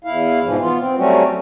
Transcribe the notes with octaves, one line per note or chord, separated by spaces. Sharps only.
E2 E4 F5
G#2 B2 E3 F3
B3 F4
C4
F#3 G3 A3 C4 C#4 F#4